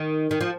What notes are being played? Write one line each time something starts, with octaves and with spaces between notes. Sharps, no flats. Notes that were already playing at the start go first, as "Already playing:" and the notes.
Already playing: D#3
D#3
F3